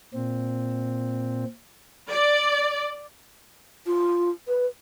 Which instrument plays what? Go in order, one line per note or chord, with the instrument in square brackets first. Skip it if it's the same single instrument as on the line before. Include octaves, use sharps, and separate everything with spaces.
[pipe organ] A#2 C4
[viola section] D5
[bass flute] F4
B4